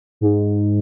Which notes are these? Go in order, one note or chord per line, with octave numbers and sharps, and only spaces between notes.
G#2